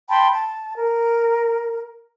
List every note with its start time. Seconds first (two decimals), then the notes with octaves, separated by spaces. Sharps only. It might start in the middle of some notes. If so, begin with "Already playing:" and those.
0.09 G5 A5 B5 C6
0.32 A5
0.77 A#4